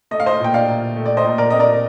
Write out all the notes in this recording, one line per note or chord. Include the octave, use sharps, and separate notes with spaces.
A3 D#5
F5
C5 D#5
A#2 G5
D5 F5
A#2
A3
D5
C5 D#5
A#2
A#4 D5
C4 D#5
A#4 D5